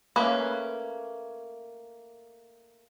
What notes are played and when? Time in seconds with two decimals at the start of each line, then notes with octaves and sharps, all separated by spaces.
0.16 A3 A#3 C#4 B4